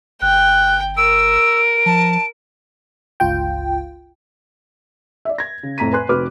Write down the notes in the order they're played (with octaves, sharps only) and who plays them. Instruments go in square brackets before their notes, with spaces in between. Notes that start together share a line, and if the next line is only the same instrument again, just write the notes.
[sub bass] G1 [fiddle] G5 [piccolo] F#6
[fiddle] A#4 [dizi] E6 [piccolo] D7
[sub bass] F3 [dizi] A5
[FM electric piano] G1 C#2 F4 G5
[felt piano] D5 E5
G#6 A#6
C#3
F2 A2 A#5 B6 D#7
B4 G#5 C6 F#6
F1 C4 F#4 B4 D6 F6